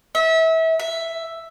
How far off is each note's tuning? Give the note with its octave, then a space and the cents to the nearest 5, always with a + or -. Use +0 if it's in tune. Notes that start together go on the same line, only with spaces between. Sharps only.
E5 -30
E5 +5